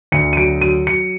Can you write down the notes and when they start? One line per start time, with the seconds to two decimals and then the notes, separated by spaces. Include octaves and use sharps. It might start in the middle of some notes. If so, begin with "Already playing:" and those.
0.12 D2 C#7
0.33 D#7
0.37 F#3 D7
0.61 F#3 D#7
0.87 F#3 C#7